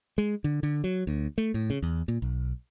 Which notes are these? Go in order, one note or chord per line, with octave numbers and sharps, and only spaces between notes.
G#3
D3
D3
F#3
D2
A3
A2
C#3
E2
A#2
B1